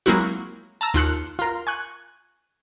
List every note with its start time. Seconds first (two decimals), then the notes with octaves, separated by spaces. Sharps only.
0.06 F#3 G#3 A#3 C4 E4 F#4
0.81 A5 A#5 E6
0.94 D#2 F4 F#6 C#7
1.39 F4 A#4
1.67 G#5 C#6 F#6